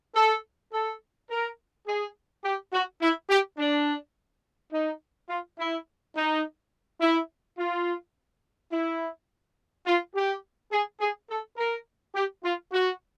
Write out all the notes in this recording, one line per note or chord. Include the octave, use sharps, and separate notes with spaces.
A4
A4
A#4
G#4
G4
F#4
E4
G4
D4
D#4
F4
E4
D#4
E4
F4
E4
F4
G4
G#4
G#4
A4
A#4
G4
F4
F#4